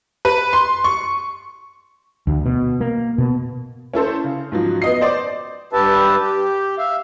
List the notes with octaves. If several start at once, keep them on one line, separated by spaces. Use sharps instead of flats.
B4
C6
C#6
D2
B2
A#3
B2
C#4 E4 A4 C5
C#3
G#2 F3 F#3
B3 D#5 C7
C5 D5
G2 G4 B4 E5 A5
G4
E5 F5